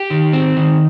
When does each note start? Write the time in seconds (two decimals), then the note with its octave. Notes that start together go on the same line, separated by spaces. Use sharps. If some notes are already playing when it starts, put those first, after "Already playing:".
Already playing: G4
0.10 D#3
0.33 C4
0.57 D#3